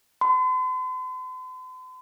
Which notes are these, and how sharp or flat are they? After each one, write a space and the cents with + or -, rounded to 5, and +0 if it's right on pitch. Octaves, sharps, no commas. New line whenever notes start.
C6 -45